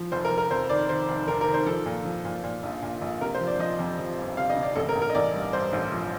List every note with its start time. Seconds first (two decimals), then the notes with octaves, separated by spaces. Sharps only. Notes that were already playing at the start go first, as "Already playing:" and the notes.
Already playing: F3
0.12 F1 C5
0.25 A#4
0.31 F1
0.38 A#4
0.50 F2 C5
0.69 D#3 D5
0.89 D#3 C5
1.09 F1
1.28 F1 A#4
1.41 A#4
1.48 D#3
1.54 C5
1.66 F3 A4
1.86 A#2
2.05 F3
2.25 A#2
2.44 A#2
2.63 A#1
2.83 A#2
3.02 A#1
3.21 C3 A#4
3.34 C5
3.41 F3
3.47 D5
3.59 F3 D#5
3.79 F2
3.99 F3
4.18 G1
4.37 C3 F5
4.50 D#5
4.56 C3
4.63 D5
4.75 A1 A4
4.89 A#4
4.95 A1
5.02 A#4
5.10 D#5
5.15 A1 D5
5.34 G2
5.53 G2 C5
5.73 A1
5.92 F3